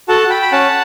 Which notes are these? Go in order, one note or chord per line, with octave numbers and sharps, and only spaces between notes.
F#4 A4 F#5 A5
G5 B5
B5
C#4 F#5 A5